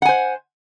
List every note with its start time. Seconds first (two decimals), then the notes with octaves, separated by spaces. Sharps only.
0.02 F#5
0.05 G#5
0.09 C5